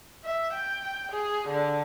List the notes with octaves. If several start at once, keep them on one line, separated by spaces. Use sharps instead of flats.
E5
G5
G#4
D3